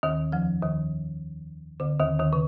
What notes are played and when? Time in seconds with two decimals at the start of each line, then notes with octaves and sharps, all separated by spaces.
0.03 D#2 D#3
0.32 F2 F3
0.62 D#2 D#3
1.80 D2 D3
2.00 D#2 D#3
2.19 D#2 D#3
2.33 C#3